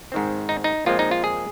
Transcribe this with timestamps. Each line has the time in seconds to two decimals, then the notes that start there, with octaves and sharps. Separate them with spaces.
0.12 G#2 D#3 C4
0.49 D#4
0.64 D#4
0.86 A#2 F3 G#3 C4 F4
0.99 D#4
1.11 F4
1.24 G#4